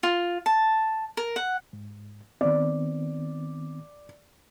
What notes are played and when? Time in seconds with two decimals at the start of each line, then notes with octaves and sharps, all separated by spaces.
0.03 F4
0.46 A5
1.17 A#4
1.36 F#5
1.73 G#2
2.41 D#3 B3 C4 D5